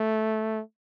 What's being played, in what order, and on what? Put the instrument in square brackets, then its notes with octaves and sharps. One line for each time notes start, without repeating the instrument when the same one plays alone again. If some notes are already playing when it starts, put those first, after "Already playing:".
Already playing: [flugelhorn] A3